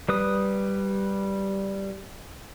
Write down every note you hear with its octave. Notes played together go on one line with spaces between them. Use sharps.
G3 B4 D#6